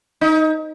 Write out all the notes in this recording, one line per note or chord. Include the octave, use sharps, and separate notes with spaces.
D#4